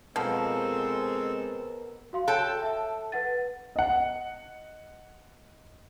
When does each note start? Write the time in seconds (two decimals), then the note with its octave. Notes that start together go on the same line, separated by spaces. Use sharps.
0.16 B2 F3 G#3 C4 A4 A#4 C#6
2.13 F#4 F5 C6
2.28 A4 C#5 G5 F#6
2.62 E5 A5
3.12 B4 F#5 A6
3.76 D#5 F#5